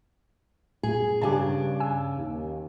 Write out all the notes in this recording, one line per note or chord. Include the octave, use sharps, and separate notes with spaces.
A#2 A3 G#4
G2 C#3 D4 G4 G#5 A5
G#5 E6
D#2